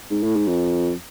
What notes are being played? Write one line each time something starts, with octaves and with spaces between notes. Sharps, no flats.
G#2
A2
G#2
F2